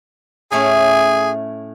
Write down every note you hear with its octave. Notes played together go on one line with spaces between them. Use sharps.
A2 A3 C#4 G#4